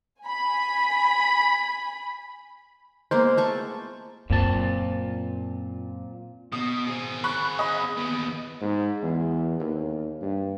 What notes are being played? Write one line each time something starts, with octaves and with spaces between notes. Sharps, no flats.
G#5 B5
G#3 A#3 B3 C5
A3 A4 C#6
F#2 A#2 C4 A5
B2 D#6
C4 G#4
B5 C#6 F#6
D#5 B5
D#2 B3
G#2
E2
D#2
G2